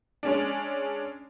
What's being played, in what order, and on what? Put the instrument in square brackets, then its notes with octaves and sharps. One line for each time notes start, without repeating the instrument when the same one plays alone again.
[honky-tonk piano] G#3 C#4 D4